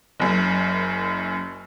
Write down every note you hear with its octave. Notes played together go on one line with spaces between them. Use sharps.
F#1 F#2